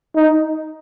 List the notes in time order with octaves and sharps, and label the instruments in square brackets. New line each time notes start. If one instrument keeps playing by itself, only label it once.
[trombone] D#4